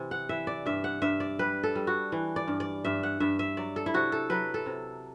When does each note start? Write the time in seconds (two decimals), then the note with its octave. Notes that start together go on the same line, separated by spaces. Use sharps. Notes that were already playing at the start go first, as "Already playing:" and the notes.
Already playing: C3 E3
0.11 F#5
0.29 E3 E5
0.47 D5
0.66 G2 E5
0.84 F#5
1.02 G2 E5
1.20 D5
1.39 G3 B4
1.63 A4
1.75 G3
1.87 F#4
2.12 E3
2.36 D5
2.48 G2
2.60 D5
2.84 G2 E5
3.03 F#5
3.20 G2 E5
3.39 E5
3.57 F#3 D5
3.76 A4
3.86 E4
3.94 C3 F#4
4.12 A4
4.30 F#3 B4
4.54 A4
4.66 C3